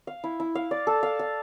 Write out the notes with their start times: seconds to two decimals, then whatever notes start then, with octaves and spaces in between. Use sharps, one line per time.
0.07 F5
0.24 E4
0.40 E4
0.55 F5
0.71 D5
0.87 A4
1.03 F5
1.19 F5